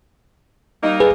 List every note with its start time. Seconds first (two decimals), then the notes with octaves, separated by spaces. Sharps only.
0.83 G3 A#3 D#4
1.00 G#4 B4